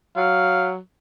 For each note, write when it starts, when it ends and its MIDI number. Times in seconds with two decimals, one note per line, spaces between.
0.17 0.78 54
0.17 0.68 77